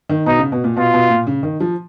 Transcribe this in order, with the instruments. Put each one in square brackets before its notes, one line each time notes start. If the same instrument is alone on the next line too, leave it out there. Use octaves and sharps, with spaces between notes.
[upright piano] D#3
[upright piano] B2 [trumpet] D#4
[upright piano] C#3
B2
A#2
[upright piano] B2 [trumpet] F4
[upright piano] B2
A#2
C#3
D#3
F3